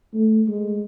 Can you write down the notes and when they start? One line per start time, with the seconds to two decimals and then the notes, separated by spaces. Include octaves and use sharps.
0.14 A3
0.48 G#3